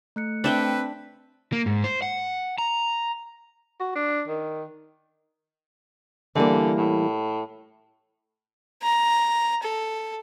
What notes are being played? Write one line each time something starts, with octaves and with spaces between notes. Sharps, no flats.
A3 F#6 C#7
C4 D4 B4 E5 G5
A#3
G#2
C5
F#5
A#5
F#4
D4
D#3
D3 E3 G3 A#3
A2
A#5
A4